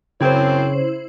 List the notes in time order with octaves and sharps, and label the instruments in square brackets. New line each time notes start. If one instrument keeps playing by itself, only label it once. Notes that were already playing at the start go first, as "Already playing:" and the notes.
[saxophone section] F#2 C4 [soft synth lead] C#3 [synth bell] E4 C5 [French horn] C#5